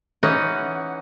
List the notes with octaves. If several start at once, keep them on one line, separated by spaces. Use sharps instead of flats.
E3 C#4 D#4 D#5 F#5